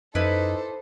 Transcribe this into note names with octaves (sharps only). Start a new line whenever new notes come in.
F#2 D#4 E4 A4 B4 C5 D5